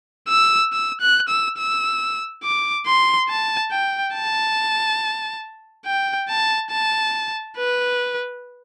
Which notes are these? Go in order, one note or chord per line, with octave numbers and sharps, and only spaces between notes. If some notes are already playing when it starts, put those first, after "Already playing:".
E6
E6
F#6
E6
E6
D6
C6
A5
G5
A5
G5
A5
A5
B4